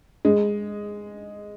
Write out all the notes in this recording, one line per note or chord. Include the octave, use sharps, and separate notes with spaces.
G#3